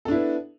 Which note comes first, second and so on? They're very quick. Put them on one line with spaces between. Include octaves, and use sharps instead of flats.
A4 D4 E4 B3